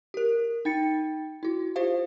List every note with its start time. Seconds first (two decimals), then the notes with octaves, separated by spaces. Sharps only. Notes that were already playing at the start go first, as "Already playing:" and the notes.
0.14 G4 A#4
0.65 D#4 G5 A6 C#7
1.43 E4 F#4
1.76 F4 G4 C5 F5